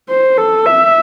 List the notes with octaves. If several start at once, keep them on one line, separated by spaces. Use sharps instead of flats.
C5
A4
E5